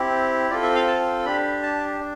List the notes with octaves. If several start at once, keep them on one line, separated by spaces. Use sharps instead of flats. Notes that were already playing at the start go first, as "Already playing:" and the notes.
Already playing: C4 E4 G4
C4 F4 A4 D5
E5
F5
A5
D4 G4 B5
A5
D4